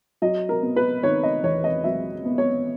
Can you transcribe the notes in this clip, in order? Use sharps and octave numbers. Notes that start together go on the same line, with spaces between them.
F#3 D#5
A#4
B3
B4
D#3 C#5
D#5
E2 C#5
D#5
F#3 E5
B3
C#5